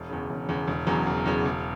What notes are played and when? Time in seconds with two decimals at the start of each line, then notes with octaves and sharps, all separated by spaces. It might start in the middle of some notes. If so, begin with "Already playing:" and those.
Already playing: E1
0.10 E2 C#3
0.30 E1
0.49 E2 C#3
0.68 E1
0.87 E2 C#3 F#3
1.07 E1
1.26 E2 C#3 F#3
1.45 E1